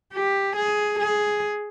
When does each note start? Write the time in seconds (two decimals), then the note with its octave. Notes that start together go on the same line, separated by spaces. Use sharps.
0.13 G4
0.56 G#4
0.99 G#4